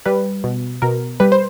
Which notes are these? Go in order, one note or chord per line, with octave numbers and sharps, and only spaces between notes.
G3 B4
B2
B2 A#4
G3 B4
C5